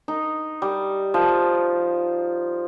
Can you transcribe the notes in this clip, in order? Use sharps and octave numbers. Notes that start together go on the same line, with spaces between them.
D#4
G3
F3